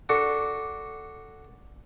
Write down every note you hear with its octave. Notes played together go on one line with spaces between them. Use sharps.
D4 F#4 A4